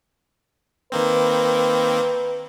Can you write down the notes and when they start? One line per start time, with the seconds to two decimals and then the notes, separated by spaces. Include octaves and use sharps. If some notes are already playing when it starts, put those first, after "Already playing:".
0.92 D#3 A#3 C4 B4